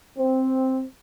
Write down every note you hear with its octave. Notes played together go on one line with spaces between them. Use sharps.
C4